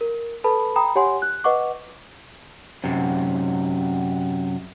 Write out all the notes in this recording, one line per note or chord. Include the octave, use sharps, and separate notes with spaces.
A#4
A4 B4 A5 B5
G5 A#5 B5 D#6
G4 C#5 F#5 G#5 C6
F#6
B4 D#5 F#5 C#6 D6
F#2 C3